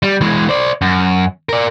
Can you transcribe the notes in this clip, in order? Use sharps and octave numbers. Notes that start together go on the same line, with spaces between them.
G3
E3 G#3
C5 D5
F#2
A#4 D5